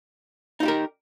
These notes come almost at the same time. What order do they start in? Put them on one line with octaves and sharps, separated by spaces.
D#4 F4 G4 A#4